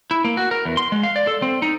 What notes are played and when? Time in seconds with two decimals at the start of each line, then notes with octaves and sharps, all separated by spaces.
0.11 E4
0.24 A#3
0.37 F#4
0.51 A#4
0.65 E2
0.77 C6
0.92 G#3
1.03 F5
1.16 D5
1.27 A4
1.42 C4
1.62 D#4